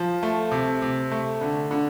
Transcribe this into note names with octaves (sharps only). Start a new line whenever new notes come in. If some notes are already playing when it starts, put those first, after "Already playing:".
Already playing: F3
A3
C3
C3
A3
D3
D3